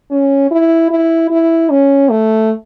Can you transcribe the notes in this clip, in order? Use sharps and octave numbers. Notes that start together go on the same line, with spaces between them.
C#4
E4
E4
E4
C#4
A3